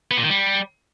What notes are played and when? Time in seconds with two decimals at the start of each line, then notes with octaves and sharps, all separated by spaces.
0.11 B3
0.17 A#2
0.24 D#3
0.30 G3